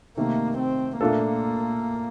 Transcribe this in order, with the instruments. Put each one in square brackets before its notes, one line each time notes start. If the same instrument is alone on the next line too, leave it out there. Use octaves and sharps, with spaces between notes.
[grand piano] C3 D#3 A3 [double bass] A#3
[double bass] C4
[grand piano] A#2 A3 D4 F4 A4 [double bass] A#3